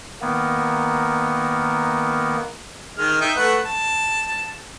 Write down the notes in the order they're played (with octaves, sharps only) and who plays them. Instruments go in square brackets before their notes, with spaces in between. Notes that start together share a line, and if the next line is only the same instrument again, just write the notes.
[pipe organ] D#3 A#3 B3
[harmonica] D#3 G#3 F6
D#4 E5 G5
A3 B4 F#5
A5